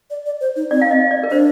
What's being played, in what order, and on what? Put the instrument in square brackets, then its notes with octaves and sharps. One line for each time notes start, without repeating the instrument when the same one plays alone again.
[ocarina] D5
D5
C5
D#4
[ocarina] C4 [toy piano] D5
[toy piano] F5
D#5
D5
A#4
[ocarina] D4 [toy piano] C5